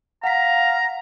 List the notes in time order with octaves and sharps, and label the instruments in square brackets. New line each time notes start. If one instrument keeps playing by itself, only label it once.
[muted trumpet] F5 [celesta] F#5 B6 [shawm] A#5